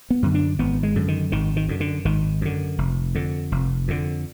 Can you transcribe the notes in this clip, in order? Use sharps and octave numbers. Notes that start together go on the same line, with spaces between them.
B3
F#2 D3
D4
G#1 B3
G#3
F#2 D3
D#3
G#1 D#3
D#3
F#2 D3
D3
G#1 D#3
F#2 D3
F1
F2 D3
F1
F2 D3